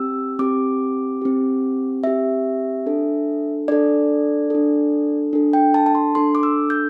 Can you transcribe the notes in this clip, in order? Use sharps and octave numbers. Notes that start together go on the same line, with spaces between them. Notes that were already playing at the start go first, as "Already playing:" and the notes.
Already playing: C4 G4 E6
C4 G4 D6
C4 G4
C4 G4 E5
D4 A4
D4 A4 D5
D4 A4
D4 A4
G5
A5
A5
C6
D4 A4 C6
D6
E6
G6